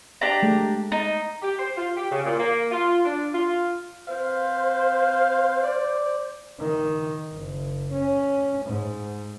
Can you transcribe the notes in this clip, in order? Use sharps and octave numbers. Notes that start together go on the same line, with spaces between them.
D4 G4 A#5
G#3 A3
D#4
G4
C5
F4
G4
C#3
A#2
A#3
F4
D4
F4
C4 B4 C5 F5
D5
D#3
F#1
C#4
G#2